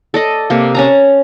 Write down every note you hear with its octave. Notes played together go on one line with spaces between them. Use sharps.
A4 D5 D#5
C3 A#3
C#4 A5 A#5